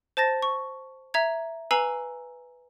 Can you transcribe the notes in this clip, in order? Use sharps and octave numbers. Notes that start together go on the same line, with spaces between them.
C5 A5 A6 A#6
C#6
E5 A#5 G#6
B4 G#5 A#5 E6 C7 F#7